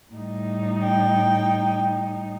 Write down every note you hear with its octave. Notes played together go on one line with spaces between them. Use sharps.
A2 G3 D#4
G5